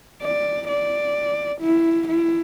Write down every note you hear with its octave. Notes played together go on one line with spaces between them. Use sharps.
D5
D5
E4
E4